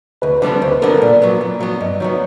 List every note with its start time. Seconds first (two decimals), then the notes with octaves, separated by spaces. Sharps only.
0.22 D2 B4
0.42 D3 G3 B3 D4 B4
0.56 B4
0.62 D2 C5
0.71 B4
0.81 D3 G3 B3 D4 A#4
0.91 A4
1.01 A#2 D5
1.22 F#3 B3
1.41 A#2
1.60 F#3 B3
1.81 G2 D#5
2.00 D#3 F#3 B3 C#5